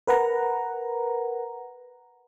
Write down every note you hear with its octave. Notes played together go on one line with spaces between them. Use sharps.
A#4 B4 F#5 A#5